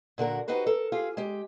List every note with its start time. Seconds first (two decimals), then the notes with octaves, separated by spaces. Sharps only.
0.18 A#2 D3 F#4 A#4
0.48 D#4 F#4 G4 B4 C5
0.67 A4 A#4
0.92 F4 G4 G#4
1.17 G#3 G4